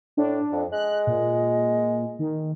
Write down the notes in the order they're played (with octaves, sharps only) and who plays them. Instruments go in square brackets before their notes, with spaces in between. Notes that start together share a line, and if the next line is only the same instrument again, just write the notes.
[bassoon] A2 [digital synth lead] D4
[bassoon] F2
[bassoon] G#3 [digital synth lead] F#6
[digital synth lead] A#2
D#3